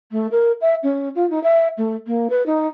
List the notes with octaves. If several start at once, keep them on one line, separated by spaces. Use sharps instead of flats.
A3
A#4
E5
C#4
F4
D#4
E5
A3
A#3
B4
D#4